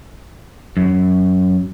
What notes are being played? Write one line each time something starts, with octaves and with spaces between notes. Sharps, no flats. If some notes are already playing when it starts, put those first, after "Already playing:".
F#2